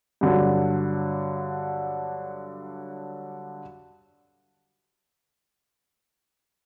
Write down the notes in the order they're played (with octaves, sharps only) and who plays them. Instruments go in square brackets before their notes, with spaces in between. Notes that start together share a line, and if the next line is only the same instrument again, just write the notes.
[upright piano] G2 D3 F#3